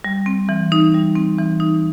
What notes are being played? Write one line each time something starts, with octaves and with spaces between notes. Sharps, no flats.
G3
C4
E3
D#4
G3
C4
E3
D#4